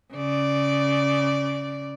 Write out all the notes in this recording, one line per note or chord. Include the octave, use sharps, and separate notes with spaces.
C#3 D5